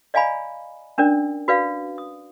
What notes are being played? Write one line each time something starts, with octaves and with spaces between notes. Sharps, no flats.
D5 D#5 F5 G#5 A#5 B5
C#4 D4 A#4 D5
F#4 B4 D5 F5
D#6